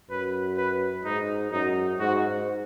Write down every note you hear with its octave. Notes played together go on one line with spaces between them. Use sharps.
F#2 B4
B4
G#2 D#4
F#2 D#4
G#2 F#4